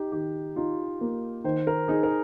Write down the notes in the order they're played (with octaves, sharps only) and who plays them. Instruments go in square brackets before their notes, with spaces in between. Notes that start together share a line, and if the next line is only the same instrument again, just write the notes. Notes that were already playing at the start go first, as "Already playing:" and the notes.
Already playing: [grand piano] D#4 G4
[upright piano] D#3 [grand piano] G4
[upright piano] D#4 [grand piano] F4
[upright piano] A#3
[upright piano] D#3 [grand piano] C5
[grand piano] A#4
[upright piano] D#4 [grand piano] G#4
[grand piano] A#4